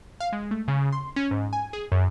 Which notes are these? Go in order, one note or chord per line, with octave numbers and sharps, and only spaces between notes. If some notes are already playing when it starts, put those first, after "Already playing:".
F5
G#3
A3
C#3
C6
C#4
G#2
G#5
G#4
F#2